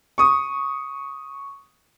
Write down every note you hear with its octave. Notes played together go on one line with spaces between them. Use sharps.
C#6 D#6